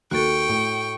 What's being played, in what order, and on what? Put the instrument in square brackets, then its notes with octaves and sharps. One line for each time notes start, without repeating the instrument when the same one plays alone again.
[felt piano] D#2 [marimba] F#4 A4 [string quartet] G5 C#6
[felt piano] A2